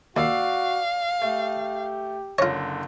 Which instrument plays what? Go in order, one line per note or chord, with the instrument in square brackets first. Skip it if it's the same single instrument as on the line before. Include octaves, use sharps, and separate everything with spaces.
[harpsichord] D#2 [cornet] F#4 [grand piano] D5 E6 C7 [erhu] F5
[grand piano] A3 [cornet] G4
[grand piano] F#1 D3 A#6 [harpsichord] F4 C#5